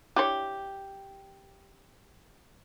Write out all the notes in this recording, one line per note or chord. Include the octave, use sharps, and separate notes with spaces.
D4 E4 G4 C#5